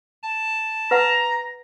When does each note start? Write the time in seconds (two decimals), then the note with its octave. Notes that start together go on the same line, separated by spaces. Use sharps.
0.23 A5
0.91 B4 F#5 A#5